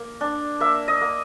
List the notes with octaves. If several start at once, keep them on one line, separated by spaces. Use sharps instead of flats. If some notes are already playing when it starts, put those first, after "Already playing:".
Already playing: A#3
D4
A#3 E5
D#5
A#3